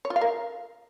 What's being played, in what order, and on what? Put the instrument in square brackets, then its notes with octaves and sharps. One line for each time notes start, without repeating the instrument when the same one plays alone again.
[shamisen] C#5
F4
F5
A#4